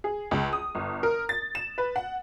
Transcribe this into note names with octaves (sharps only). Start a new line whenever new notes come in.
G#4
C#2
D#6
G1
A#4
A6
E7
B4
F#5